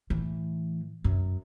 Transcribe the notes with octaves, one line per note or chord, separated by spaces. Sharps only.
A2 E3
F#2